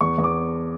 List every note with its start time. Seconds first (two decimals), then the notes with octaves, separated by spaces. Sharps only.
0.01 E2 C#6
0.18 E2
0.24 D6